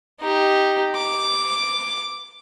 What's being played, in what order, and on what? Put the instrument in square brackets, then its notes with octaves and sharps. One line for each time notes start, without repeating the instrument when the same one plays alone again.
[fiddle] D#4 G4
D6